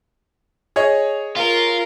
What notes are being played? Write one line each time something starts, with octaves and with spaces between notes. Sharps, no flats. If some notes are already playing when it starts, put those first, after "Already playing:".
G#4 C#5 D#5
F4 A#4